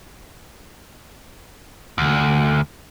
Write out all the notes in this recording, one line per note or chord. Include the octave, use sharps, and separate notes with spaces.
D2